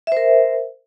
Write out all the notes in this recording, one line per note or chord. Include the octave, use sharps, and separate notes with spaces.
A#4 C5 E5